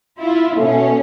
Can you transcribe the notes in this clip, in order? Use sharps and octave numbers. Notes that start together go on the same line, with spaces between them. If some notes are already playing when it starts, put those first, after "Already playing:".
E4 F4
B2 A3 C#4